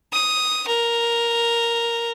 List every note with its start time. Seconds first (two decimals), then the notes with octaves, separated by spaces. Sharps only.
0.12 D#6
0.68 A#4